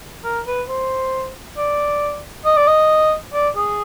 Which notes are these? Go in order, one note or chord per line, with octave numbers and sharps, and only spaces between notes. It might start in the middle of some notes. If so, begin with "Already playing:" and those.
A#4
B4
C5
D5
D#5
D5
D#5
D5
G#4